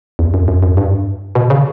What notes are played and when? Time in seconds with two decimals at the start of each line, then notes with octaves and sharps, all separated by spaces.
0.19 E2
0.34 F#2
0.48 F#2
0.63 F#2
0.77 G2
1.35 B2
1.50 C#3